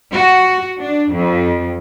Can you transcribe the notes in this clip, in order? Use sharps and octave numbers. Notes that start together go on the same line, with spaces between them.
F#4
D4
F2